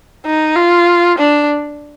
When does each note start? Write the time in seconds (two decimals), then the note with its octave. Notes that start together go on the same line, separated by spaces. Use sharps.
0.26 D#4
0.56 F4
1.18 D4